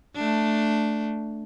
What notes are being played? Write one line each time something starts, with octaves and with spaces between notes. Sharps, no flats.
A3 D4